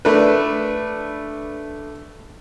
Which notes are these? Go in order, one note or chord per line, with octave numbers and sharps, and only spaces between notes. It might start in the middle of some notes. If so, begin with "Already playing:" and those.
A3 D4 B4